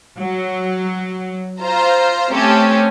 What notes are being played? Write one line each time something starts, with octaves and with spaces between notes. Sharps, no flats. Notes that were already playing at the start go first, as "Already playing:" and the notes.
F#3
F4 C5 A#5
A3 C4 C#4 G4 A4